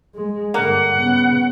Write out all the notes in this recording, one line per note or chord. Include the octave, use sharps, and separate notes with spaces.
G#3
G2 D3 A#3 F#5
C#3 B3